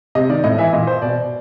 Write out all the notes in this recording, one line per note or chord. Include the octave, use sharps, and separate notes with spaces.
C3 D#5
D#3 D5
A2 D#5
E3 E5
A#2 D#5
C5
B2 D5